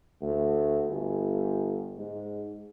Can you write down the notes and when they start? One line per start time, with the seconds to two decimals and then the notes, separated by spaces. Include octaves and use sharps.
0.22 D2
0.89 G1
1.97 G#2